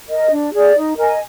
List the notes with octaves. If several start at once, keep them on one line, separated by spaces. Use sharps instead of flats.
A#4 D#5
D4
G#4 D5
D#4
A#4 D#5 G#5